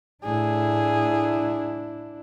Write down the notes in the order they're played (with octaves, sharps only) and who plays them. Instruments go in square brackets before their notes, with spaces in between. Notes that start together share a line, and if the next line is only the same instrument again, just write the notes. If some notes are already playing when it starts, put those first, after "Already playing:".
[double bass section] A2 [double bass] D4 E4 [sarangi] G#4